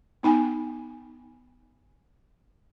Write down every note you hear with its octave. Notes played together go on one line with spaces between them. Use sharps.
B3 D#4 G5 G#5